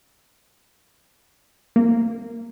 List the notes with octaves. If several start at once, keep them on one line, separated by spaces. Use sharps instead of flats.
A#3